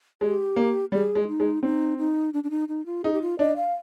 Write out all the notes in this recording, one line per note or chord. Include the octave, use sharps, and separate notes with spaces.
G#3 G4
A#3
G3 G#4
G#3
D#4
G#3
C4 D#4
D#4
D4
D4
D#4
D#4
F4
D#4 G#4
G4
F4
D4 D#5
F5